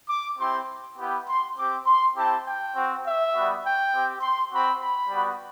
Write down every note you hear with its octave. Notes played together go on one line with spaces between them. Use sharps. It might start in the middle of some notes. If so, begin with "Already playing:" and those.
D6
C4 E4 G4 C6
B3 E4 G4
C6
C4 G4 D6
C6
C4 E4 G4 A5
G5
C4 F#4
E5
G3 B3 F#4
G5
C4 G4
C6
C4 F#4 B5
B5
G3 B3 F#4